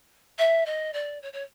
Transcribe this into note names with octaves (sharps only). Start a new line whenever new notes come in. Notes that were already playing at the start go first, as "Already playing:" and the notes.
E5
D#5
D5
C#5
C#5